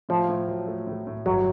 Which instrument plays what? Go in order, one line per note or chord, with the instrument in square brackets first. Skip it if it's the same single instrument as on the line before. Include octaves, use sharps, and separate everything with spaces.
[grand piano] A2 [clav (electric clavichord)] F3
[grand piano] A2
F#3
A3
A2
A2
[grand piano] G1 [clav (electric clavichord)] F#3